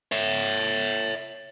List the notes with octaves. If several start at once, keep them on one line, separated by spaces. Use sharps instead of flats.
C#5 E5